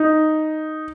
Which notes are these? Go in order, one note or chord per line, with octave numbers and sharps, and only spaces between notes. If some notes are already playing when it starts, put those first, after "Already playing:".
Already playing: D#4